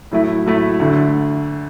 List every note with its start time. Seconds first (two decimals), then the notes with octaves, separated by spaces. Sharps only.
0.11 A2 F#3 A3 E4
0.46 A2 F#3 A3 E4
0.80 D2 D3 A3